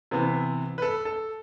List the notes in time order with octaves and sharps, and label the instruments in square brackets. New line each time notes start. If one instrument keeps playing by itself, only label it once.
[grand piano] C3 E3 B3
B4
A4
A4